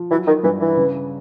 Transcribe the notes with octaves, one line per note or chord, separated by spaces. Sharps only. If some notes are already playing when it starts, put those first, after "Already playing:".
Already playing: F3
E3 F#3
D#3
G2 E3
E3
C#3